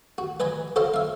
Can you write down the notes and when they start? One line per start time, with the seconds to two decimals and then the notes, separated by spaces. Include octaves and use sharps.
0.18 F#4
0.40 B4 D#5 G#5 B5
0.76 F#4 A4 C5 D#5 F5
0.94 E5 F5